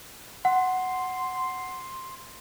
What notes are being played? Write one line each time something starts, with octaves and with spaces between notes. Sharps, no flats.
F#5 C6